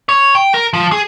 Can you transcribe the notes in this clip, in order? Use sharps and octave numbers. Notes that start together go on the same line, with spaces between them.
C#5
G5
A#4
F3
G#4